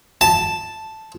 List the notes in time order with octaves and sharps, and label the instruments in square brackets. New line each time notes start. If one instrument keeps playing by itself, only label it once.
[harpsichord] A5